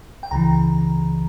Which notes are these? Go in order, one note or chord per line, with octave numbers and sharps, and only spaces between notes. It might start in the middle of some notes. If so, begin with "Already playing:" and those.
G5
C#2 C#3 E3 A#5